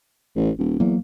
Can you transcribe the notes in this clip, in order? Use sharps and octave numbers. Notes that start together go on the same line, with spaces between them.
A1
D#1
E2 F#3 A#3